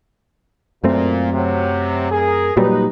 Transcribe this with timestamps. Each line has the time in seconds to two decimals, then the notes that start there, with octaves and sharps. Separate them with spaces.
0.84 F#2 A#2 A3 C4
1.32 C3 F#3
2.11 G#4 A#4
2.57 A#2 F#3 G3 D#4 B4